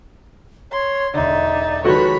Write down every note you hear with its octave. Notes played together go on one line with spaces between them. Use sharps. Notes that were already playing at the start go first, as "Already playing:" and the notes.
C#5 C6
E1 D3 D#4 D5 E5
D#3 F3 G#3 F#4 A4 B4 C#5 B5